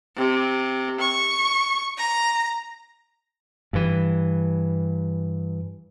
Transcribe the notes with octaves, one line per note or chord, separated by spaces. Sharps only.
C3
C#6
A#5
G2 E3